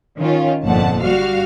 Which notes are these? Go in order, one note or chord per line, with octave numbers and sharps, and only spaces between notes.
D#3 C#4 F4
G1 F2 A#2 F#5 A5
G3 F#4 F5 F6